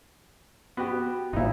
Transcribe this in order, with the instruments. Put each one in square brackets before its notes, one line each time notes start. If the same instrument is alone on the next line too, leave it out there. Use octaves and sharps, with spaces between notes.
[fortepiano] B3 F#4 G4
[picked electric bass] G#1 A#2 [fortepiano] D#4 E4